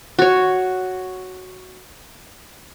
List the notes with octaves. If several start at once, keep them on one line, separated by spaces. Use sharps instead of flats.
F#4 C#5